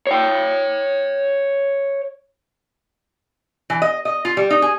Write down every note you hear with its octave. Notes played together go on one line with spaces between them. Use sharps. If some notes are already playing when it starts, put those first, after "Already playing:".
C#5 G5
E3
D#5
D#5
F4
G3
D#4
G#4